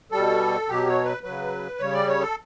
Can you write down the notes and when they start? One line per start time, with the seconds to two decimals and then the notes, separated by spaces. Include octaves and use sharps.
0.12 B2 G3 A4
0.68 B2 F#3 G4
0.87 C#5
1.05 B4
1.23 C#3 F#3 B4
1.79 C#3 G3 C#5
1.93 D5
2.08 C#5
2.21 A4